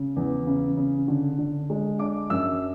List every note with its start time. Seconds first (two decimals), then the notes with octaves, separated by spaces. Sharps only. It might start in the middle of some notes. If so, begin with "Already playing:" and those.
Already playing: C#3
0.16 E2
0.47 C#3
0.77 C#3
1.08 D3
1.38 D3
1.70 G#3
1.99 D4 D6
2.30 F#2 E6